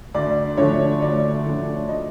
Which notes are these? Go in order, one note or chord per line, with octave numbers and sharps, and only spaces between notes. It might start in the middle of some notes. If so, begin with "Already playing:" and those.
D2 D5
D3 F3 A3 D4 C#5
D2 D5
D3 F3 A3 D4
D#5